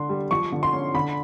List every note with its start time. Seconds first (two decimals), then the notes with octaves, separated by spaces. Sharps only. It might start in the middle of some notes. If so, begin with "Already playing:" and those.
Already playing: D3 D4 C6
0.09 G3
0.31 F3 C#6
0.52 D3
0.63 C6
0.73 C#4
0.94 D3 B5